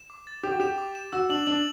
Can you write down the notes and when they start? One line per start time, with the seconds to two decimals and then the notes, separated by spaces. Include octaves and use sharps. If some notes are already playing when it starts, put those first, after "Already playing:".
Already playing: E7
0.10 D6
0.27 A6
0.43 G4 D6
0.52 F#4
0.60 G4 E7
0.78 D6
0.95 E7
1.12 F#4 E6
1.29 D4 F#7
1.47 D4 F#7